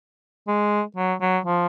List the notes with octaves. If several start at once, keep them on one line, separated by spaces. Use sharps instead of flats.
G#3
F#3
F#3
F3